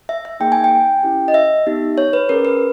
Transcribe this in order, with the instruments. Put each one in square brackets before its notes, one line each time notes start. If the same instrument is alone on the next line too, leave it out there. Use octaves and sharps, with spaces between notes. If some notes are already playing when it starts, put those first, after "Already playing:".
[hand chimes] E5
E5
A#3 D#4 G#4 G5
G#5
G5
C#4 E4 G4
D#5
E5
B3 D#4 G4
C#5
B4
C#4 G#4 A#4
B4